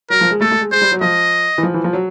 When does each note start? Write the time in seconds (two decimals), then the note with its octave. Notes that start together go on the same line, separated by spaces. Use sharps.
0.10 F#3 A#4
0.21 F3
0.31 G#3
0.41 A3 A4
0.51 A3
0.61 G#3
0.71 G#3 C5
0.81 G3
0.92 F#3
1.01 F3 D#5
1.58 E3
1.63 F3
1.74 E3
1.84 F3
1.93 F#3